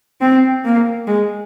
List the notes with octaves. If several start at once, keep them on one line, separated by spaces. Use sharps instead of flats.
C4
A#3
G#3